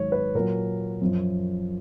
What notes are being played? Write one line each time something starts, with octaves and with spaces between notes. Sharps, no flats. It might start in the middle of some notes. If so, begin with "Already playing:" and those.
Already playing: G#2 D#3 F#3 C#5
B4
A#2 F#3 A#4
F#2 F3